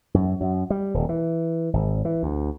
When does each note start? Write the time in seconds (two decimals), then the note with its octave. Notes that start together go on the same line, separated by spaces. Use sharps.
0.14 F#2
0.41 F#2
0.70 G3
0.94 D#1
1.09 E3
1.73 G#1
2.05 E3
2.23 D2